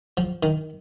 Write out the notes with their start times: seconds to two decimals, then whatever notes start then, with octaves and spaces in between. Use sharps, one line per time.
0.17 F3
0.43 D#3